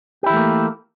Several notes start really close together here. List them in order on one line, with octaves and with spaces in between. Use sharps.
G4 E4 E3 A3 A#3